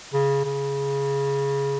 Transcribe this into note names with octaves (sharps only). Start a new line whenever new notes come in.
C#3
C#3